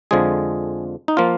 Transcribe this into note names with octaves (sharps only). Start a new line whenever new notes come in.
F2 D3 F3 G#3 G#4
D#4
F3 A#3 F4